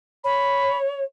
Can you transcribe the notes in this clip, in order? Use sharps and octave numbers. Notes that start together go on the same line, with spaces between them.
C#5 B5